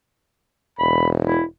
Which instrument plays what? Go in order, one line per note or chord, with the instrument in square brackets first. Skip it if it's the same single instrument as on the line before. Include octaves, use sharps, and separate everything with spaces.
[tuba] E1 [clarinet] B5
[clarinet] E4